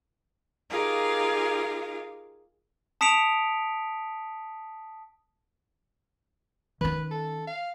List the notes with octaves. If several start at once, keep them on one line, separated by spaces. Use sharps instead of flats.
D#4 F4 G4 G#4 A#4 F5
A5 D#6 B6 C#7 D7 F7
D#3 C#4 B4
A4
F5